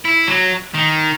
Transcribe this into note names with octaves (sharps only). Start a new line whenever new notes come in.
E4
F#3
D#3